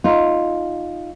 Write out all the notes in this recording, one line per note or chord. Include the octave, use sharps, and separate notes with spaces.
D#4 F4